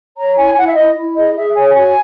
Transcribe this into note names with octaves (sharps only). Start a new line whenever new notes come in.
C#5 A#5
E4 G#5
E4 F#5
E5
E4 D#5
E4
G#4 D#5
G#4 E5
C#5 G#5
F#4 G#5